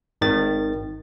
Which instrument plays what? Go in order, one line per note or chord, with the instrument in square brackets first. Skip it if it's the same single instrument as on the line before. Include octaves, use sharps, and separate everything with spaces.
[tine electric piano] G#1 D#3 A6